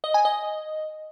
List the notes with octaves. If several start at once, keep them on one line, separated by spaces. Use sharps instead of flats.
D#5
G#5
D#5